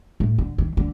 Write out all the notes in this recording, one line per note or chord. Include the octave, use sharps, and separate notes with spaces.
A2
D3
D#3
D3